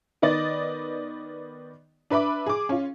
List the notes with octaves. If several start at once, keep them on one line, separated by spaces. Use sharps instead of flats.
D#3 B3 D5 D#5 A6
D4 B4 E5 B5 D6
G#4 D6
C#4 F4